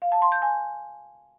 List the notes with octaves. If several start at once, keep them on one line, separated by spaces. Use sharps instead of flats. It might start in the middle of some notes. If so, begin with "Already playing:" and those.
F5
A5
C6
G6
G#5